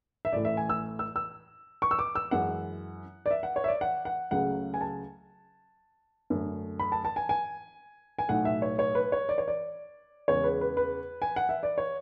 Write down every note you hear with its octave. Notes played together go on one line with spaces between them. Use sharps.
E5
A1 A2 E3 A3 D5
E5
G#5
E6
E6
E6
C#6
E6
D6
E6
F#2 E3 G#3 F#5
D5
E5
F#5
C#5
E5
D5
F#5
F#5
C#2 C#3 F#3 A3 F#5
G#5
A5
F#2 D3 A3
B5
A5
A5
G#5
G#5
G#5
B1 A2 F#3 A3 F#5
E5
C#5
C#5
B4
C#5
D5
C#5
D5
E2 C#3 G#3 C#5
B4
B4
B4
G#5
F#5
E5
D5
C#5